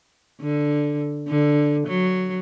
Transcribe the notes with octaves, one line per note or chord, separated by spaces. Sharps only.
D3
D3
F#3